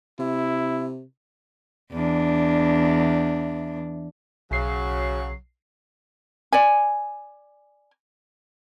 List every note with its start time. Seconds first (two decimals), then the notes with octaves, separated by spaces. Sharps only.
0.19 C3 E4
1.92 E2 D4
4.51 B1 C#3 F#3 C7
6.52 D5 G#5